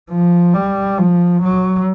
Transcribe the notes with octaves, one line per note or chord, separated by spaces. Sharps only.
F3
G3
F3
F#3